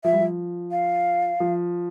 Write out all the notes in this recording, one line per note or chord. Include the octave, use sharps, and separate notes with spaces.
F3 E5
G3
F3
F5
F3